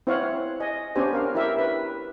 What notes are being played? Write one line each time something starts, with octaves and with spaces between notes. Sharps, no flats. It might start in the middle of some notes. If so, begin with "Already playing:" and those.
C4 E4 C5 C#5 F5 F#5
D#5 G#5
B3 C#4 D4 G4 C5 G#5
A#4 F5
E4 G4 A#4 E5
B4